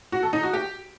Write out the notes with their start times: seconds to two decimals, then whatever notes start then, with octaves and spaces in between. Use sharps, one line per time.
0.12 F#4
0.23 A4
0.33 D#4
0.43 F#4
0.53 G4